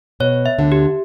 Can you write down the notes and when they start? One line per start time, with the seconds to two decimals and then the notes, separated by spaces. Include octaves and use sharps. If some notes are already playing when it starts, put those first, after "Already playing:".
0.20 B2 C#5
0.46 E5
0.59 D2 D3
0.72 G4